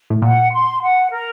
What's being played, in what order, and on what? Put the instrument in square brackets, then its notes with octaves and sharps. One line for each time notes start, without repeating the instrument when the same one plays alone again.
[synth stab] A2
[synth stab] A#2 [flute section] F#5
[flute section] C6
F#5
A#4